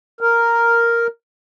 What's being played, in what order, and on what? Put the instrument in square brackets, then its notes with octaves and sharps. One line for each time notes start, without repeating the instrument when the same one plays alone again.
[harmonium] A#4